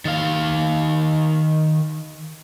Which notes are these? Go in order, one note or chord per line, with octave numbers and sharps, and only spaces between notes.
D#3 F5